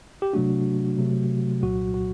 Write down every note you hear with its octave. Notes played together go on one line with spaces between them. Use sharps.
G4
C3 F#3 A3 D4 F#4
C3 F#3 A3
C2 A#2 F#3 F#4
F#4